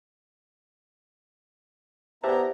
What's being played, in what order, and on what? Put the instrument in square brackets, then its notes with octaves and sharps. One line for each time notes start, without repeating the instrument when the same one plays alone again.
[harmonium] B3 E4 A#5 [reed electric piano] G4 E5 A5 [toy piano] C5 D5